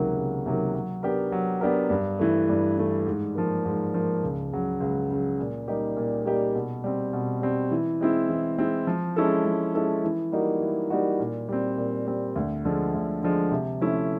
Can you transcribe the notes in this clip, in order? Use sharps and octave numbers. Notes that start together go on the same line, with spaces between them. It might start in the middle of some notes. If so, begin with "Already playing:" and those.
Already playing: C#2 C3 D#3 F#3 A#3
C#2
C3 D#3 F#3 A#3
F#3
B3 D4 G4 A#4
F#3
B3 D4 G4 A#4
G2
E3 A3
G2
E3 A3
G#2
F3 A#3
G#2
F3 A#3
C#2
C#3 F#3
C#2
C#3 F#3
A#2
G3 A#3 D#4 G4
A#2
G3 A#3 D#4 G4
B2
G3 C4
B2
G3 C4
E3
G#3 C4 E4
E3
G#3 C4 E4
F3
G#3 C#4 E4 A4
F3
G#3 C#4 E4 A4
E3
G3 A#3 D#4 F#4
E3
G3 A#3 D#4 F#4
A#2
G3 C4
A#2
G3 C4
D2
D3 F3 G#3
D2
D3 F3 G#3
C3
F3 A3 C#4 E4